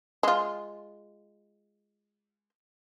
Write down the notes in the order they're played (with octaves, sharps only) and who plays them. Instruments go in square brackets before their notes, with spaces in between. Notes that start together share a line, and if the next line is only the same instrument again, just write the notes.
[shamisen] G#3 F4